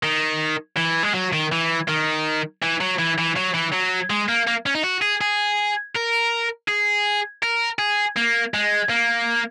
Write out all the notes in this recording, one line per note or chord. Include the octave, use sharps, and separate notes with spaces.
D#3
E3
G#3
F#3
D#3
E3
D#3
E3
F#3
E3
E3
F#3
E3
F#3
G#3
A#3
A#3
C#4
D#4
F#4
G#4
G#4
A#4
G#4
A#4
G#4
A#3
G#3
A#3